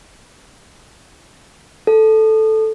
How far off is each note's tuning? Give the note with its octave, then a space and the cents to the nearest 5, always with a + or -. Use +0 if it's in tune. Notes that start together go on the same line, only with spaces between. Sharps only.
A4 -5